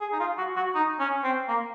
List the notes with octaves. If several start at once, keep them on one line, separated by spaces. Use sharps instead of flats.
G#4
D#4
F4
F#4
F#4
D#4
C#4
C4
A#3